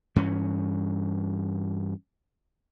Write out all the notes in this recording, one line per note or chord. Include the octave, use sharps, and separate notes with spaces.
G2 E3 C#4